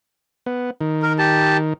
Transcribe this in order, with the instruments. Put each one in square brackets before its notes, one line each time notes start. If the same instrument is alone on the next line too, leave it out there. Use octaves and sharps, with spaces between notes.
[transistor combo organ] B3
D#3
[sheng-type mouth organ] A#4
G4 A5